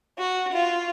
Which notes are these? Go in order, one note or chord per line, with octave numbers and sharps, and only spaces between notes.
F#4
F4